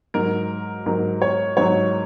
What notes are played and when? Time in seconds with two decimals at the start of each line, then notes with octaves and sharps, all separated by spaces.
0.14 G#2 F#3 A#4
0.86 G#2 F#3 A#4
1.22 C#5
1.57 G#2 F#3 C#5